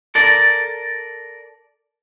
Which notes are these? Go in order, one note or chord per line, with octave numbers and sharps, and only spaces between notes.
A4 A#4 D5